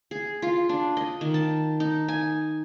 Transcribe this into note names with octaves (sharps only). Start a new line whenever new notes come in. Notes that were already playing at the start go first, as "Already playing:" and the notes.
G#4
F4
D4
D#5
D#3
A5
D#4
G#5